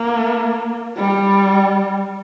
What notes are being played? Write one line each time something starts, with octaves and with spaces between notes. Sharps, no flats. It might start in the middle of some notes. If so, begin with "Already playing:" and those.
Already playing: A#3
G3